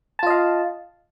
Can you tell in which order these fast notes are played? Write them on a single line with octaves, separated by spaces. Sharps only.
A5 F4 D#5 F5